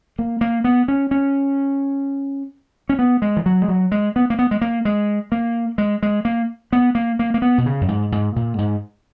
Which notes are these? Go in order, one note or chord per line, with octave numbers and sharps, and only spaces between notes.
A#3
A#3
B3
C#4
C#4
C#4
B3
G#3
E3
F#3
G#3
F#3
G#3
B3
A#3
B3
G#3
A#3
G#3
A#3
G#3
G#3
A#3
B3
A#3
A#3
A#3
B3
B2
C#3
F#2
G#2
G#2
A#2
G#2